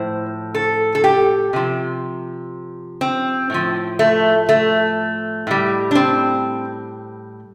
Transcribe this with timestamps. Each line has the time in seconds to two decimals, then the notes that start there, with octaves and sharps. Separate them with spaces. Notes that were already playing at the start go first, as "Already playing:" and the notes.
Already playing: A2 F3 C5
0.55 A4
0.95 A4
1.04 G4
1.53 C3 F3
3.01 C4
3.50 A2 F3
3.99 A3
4.49 A3
5.47 A2 G3
5.91 D4
5.95 C4